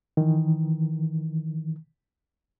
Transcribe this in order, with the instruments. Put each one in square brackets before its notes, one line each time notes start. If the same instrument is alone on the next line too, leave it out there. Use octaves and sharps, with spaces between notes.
[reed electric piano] D#3 E3